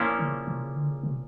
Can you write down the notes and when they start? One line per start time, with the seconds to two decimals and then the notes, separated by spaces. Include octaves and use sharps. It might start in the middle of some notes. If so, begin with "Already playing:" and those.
Already playing: A#2 F3 A#3 C#4 E4
0.19 C#3
0.47 C3
0.61 C#3
0.75 D3
0.89 C#3
1.03 C3